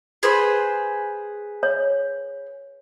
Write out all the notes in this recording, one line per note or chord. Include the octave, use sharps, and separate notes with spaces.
G#4 B4 C5
C#5